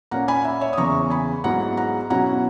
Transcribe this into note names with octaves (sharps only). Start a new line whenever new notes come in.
A#2 A#3 C#4 F#5 A#5
G#5 B5
E5 G#5
C#5 E5
D#6
E2 C#3 E3 A#5 C#6
G#5 B5
G#2 F#3 B3 E4 F#5 A#5
F#5 A#5
B2 F#3 C#4 E4 F#5 A#5